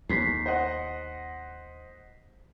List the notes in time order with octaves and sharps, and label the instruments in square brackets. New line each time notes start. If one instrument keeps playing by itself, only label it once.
[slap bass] D#2 [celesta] B6 C7
[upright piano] C5 D#5 F#5